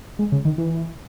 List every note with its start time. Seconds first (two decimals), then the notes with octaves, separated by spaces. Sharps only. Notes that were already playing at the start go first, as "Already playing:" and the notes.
0.19 G#3
0.32 C#3
0.45 D#3
0.58 E3